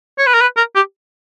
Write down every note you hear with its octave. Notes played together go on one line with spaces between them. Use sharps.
C#5
B4
A#4
B4
A#4
G4